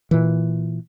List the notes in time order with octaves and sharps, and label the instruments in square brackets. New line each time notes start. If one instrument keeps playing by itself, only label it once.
[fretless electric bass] A#2 E3